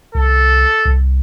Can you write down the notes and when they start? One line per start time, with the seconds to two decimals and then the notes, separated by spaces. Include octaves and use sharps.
0.15 C2 A4
0.85 C2